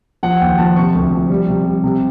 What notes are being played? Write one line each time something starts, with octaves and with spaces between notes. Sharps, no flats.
F3 F#5
D#2 G5
F3 A5
C3 C#6
D2
F3
G3
C3
G3
C3